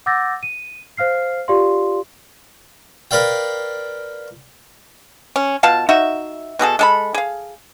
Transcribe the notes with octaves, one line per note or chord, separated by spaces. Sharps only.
F#5 D6 E6 G6 A6 A#6
D#7
C5 F5 F6 C7
F4 G4 D5 F5 C6
A#4 B4 D5 F5 G5
C#4
B2 F4 F5 A5
D#4 F#4 E5
B2 F#4 G#4 A4
G#3 A4 B5
G#4 F5